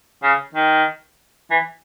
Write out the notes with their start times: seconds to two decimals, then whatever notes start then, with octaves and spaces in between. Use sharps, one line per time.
0.23 C#3
0.55 D#3
1.51 E3